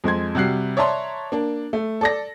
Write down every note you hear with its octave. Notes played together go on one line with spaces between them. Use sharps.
F2 G#3 C6 G#6
C3 G3 F#4 F#6 C7
C#5 D5 E5 A5 A#5 C6
A#3 D4
A3
A4 D5 A#6